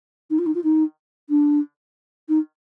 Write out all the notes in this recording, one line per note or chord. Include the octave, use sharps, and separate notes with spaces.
D#4
F4
D#4
F4
D#4
D4
D#4